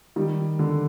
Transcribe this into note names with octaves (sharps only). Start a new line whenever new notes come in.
D#3 G3
D3